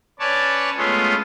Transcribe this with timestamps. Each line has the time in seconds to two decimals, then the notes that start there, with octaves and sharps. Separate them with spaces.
0.20 C#4 B4 C#5 D5 A5
0.77 G#3 A3 B3 C#4 F4